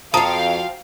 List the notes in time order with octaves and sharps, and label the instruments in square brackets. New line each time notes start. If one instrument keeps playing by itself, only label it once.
[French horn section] F2 [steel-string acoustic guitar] F3 F#4 [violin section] F5 G5 [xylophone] A5 A#5 D#6